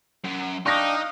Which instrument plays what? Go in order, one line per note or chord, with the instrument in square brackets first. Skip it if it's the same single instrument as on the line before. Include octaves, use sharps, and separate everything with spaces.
[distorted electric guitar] F#2
[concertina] D4 G5 [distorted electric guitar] D#4 [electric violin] F5 D#6 [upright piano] C#6 A#6